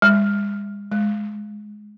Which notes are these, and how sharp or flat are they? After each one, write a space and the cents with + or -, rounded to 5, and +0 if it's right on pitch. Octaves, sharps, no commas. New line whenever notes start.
G#3 -40
G#3 +10